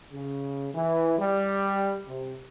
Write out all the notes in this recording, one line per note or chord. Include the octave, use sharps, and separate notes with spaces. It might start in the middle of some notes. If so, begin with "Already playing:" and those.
C#3
E3
G3
C3